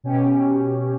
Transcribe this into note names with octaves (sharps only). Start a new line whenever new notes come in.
B2 C#4 G4